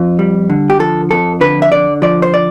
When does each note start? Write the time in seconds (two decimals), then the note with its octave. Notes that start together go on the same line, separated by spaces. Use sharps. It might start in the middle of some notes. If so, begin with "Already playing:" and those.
Already playing: F2 F4
0.19 G3
0.50 D3
0.70 G4
0.79 F3 A4
1.11 F2 A4
1.41 D3 B4
1.62 E5
1.72 D3 D5
2.02 F3 D5
2.22 C5
2.34 D5